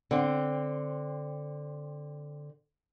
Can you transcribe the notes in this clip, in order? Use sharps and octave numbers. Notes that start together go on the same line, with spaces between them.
D3 C4